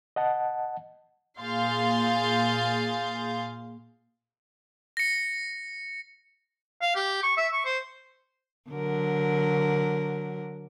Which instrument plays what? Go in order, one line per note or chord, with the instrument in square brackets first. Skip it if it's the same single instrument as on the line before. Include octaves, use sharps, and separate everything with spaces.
[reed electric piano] D#5 F#5 A5
[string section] A#2 G#4 F5 C6 G6 A6
[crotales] A#6 C#7
[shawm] F5
G4
C#6
E5
C#6
C5
[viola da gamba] D3 F#3 A#4